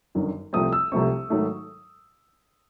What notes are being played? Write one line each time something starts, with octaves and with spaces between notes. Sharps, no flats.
G1 F#2 D#3
C2 C3 F3 A3 C4 D#6
E6
C2 C3 F3 A3 C4 C#6
G#2 D#3 F#3 A3